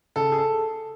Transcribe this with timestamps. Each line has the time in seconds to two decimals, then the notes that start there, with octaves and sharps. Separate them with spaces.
0.16 C#3 A4
0.32 G#4
0.38 A4